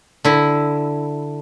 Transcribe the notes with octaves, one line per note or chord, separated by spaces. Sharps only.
D3 E4